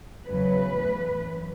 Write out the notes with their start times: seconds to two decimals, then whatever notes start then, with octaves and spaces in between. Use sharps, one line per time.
0.25 E2 C#3 F#3 B4
0.74 A2 E3
1.23 F#2